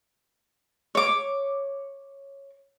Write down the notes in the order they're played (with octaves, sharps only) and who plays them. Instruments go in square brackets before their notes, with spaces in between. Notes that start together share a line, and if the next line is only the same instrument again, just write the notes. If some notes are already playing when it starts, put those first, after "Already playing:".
[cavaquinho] C#5 D6